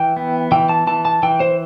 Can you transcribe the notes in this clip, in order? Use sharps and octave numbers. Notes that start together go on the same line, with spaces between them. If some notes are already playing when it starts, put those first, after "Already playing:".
Already playing: E3 G5
B3
E3 G5
A5
E3 A5
A5
E3 G5
C5